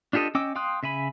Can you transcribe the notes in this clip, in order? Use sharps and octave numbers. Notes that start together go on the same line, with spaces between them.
D4 F4 G4 A4 D#5
C#4 D#5 G5 D6 E6
F5 G5 C6 D#6 F#6
C#3 E5 G#5 B5